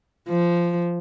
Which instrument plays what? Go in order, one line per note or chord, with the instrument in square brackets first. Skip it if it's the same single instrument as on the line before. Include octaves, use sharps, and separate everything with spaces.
[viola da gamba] F3